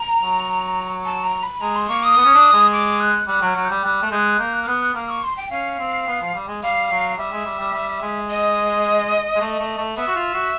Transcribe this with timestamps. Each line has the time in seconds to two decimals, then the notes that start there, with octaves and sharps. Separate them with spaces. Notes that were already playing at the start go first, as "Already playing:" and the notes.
Already playing: A#5
0.22 F#3
1.05 A5
1.24 A#5
1.43 B5
1.61 G#3 A#5
1.75 C6
1.88 A#3 C#6
2.03 D#6
2.17 B3
2.25 C#4
2.35 D4
2.53 G#3
2.72 D6
3.00 F#6
3.27 G3 F#6
3.41 F#3
3.47 F6
3.56 F#3
3.65 G6
3.70 G3
3.84 G3 F#6
4.02 A3
4.11 G#3 G6
4.16 F#6
4.39 A#3 G6
4.53 F#6
4.62 F6
4.67 B3 F#6
4.81 F#6
4.95 A#3 F6
5.09 C#6
5.23 C6
5.37 G5
5.50 C#4 F5
5.79 C4
6.07 B3
6.21 F3
6.35 G3
6.48 G#3
6.63 G3 F5
6.91 F#3
7.18 G3 E5
7.32 G#3
7.45 G3
7.59 G3
7.73 G3
8.02 G#3
8.30 D#5
9.36 G#3
9.41 A3
9.59 A3
9.78 A3
9.97 B3 E5
10.07 F#4
10.16 F4
10.34 F#4